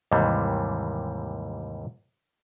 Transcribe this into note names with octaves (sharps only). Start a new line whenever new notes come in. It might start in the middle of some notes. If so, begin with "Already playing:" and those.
D#2 G#2 C3 E3 G3